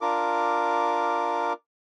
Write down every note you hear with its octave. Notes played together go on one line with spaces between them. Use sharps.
D4 F4 A#4 D6